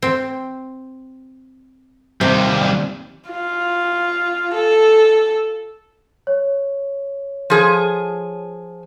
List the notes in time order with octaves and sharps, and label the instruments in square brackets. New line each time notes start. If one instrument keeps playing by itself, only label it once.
[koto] C4
[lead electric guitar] D#2 G3 [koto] C3
[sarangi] F4
A4
[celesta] C#5
[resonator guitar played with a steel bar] F3 G#4